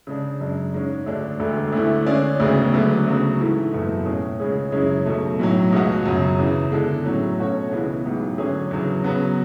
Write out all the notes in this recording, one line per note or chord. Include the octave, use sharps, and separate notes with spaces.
C#3 G#3 D4
F#2 C#3 G#3 D4
G#2 G#3 C#4
D2 D3 G#3 D4
E1 D2 D3 A3
D2 D3 A3 E4
D3 G#3 C#4 G#4 D5
E1 D2 C#3 G#3 B3
D2 D3 F#3 B3
D2 C#3 F#3
G#2 E3 A3 E4
F#1 E2 B2 A3
A2 G#3 C#4 G#4
C#2 C#3 G#3 C#4 G#4
F#2 C#3 G#3 C#4 E4
B1 B2 A3
B1 A2 F#3
C#2 B2 G#3 B3 F#4
F#2 C#3 F#3
E2 C#3 E3
D3 G#3 B3 E4 A4
A2 F#3 C#4
B2 A3 C#4 F#4 C#5
C#2 C#3 E3 G#3 B3
A1 G#2 F#3
D3 F#3 C#4 G#4
E2 C#3 F#3
C#3 F#3 B3